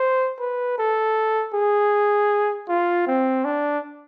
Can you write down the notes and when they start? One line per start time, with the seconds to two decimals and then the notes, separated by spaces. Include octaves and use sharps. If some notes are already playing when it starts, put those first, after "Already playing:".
Already playing: C5
0.40 B4
0.78 A4
1.54 G#4
2.68 F4
3.07 C4
3.45 D4